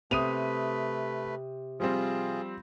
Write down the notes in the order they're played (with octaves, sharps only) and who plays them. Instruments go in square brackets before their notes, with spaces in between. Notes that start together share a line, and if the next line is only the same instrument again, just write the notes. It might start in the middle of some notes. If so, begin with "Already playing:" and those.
[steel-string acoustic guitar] C3 [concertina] A3 B4 [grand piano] D#6 D#7 F7
[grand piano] F3 G3 C4 [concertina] F4 G#4